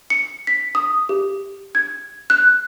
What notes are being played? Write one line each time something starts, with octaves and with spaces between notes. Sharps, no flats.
C#7
B6
D#6
G4
G#6
F#6